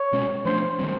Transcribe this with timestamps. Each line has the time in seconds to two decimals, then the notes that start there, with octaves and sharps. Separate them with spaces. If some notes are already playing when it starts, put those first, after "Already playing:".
Already playing: C#5
0.13 B2 G#3 C#4
0.45 F3 A3 D4 C5
0.79 D#3 G3 C4